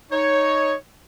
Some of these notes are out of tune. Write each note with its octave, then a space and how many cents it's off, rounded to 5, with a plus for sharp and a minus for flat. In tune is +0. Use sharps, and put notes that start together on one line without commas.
D#4 +0 C#5 +0